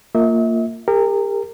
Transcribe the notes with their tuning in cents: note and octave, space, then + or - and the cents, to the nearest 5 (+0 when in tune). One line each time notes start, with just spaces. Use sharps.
A#3 -20 F4 +0 E5 -45
G4 +40 A#4 -20